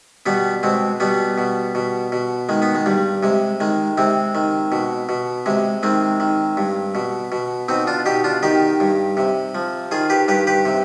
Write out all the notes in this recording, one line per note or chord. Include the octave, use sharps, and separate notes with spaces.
B2 G3 B3
B2 G#3 C4
B2 G3 B3
B2
B2
B2
D#3 G#3
B3
G#3
G2 G3
C3 G#3
D#3 G#3
C3 G#3 C4
D#3
B2
B2
C3 G#3
D#3 G#3 C4
D#3
G2
B2
B2
B2 C4 D#4
D4 F4
B2 D#4 G4
D4 F4
D#3 D#4 G4
G2
C3
F3
D#3 F4 G#4
G4 B4
G2 G4 B4
G4 B4
C3